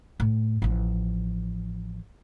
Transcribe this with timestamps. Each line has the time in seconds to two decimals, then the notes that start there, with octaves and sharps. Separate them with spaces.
0.20 A2
0.62 A1 F3